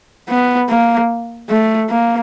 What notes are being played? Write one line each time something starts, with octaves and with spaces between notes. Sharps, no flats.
B3
A#3
A3
A#3